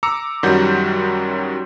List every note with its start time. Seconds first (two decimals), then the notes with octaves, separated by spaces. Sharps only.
0.03 A#5 D6 E6 C#7
0.43 F#2 D#3 F#3 G3 F#4 G6